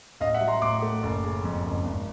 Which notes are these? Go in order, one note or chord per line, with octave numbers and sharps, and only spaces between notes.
A1 D#5 F5
E5 F#5
F#3
A#5 C6
A2 C6 D6
A3
F#1
C#3
F2
F#1
G#1